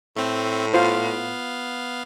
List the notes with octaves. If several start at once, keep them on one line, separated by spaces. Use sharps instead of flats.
A2 A3 C4
B3 F4 C5 F5